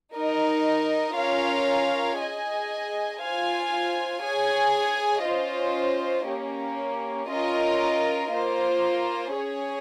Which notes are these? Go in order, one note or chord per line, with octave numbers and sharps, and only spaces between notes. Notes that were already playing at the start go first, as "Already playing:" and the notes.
D#4 A#4 D#5
C#4 F4 A#4 C#5 F5
G#4 D#5 G#5
F4 C5 F5 G#5
G#4 C#5 G#5
C#4 F4 C5 D#5
A#3 C#4 G4
C#4 F4 A#4 D#5
A#3 F4 C5
C#4 G#4 C#5 G#5